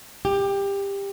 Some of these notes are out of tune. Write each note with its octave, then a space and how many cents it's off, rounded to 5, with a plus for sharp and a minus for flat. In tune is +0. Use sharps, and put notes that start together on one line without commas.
G4 +20